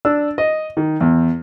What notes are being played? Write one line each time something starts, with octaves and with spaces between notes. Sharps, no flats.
D4 E6
D#5
D#3
E2